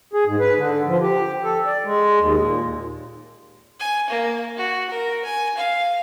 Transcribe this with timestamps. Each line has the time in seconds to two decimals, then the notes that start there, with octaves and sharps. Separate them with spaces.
0.13 G#4
0.26 G#2
0.40 B4
0.57 D3
0.86 F3
1.01 G4
1.44 A4
1.66 D5
1.84 G#3
2.20 D#2
2.40 A#2
3.80 G#5
4.09 A#3
4.57 F#4
4.90 A#4
5.24 G#5
5.57 F5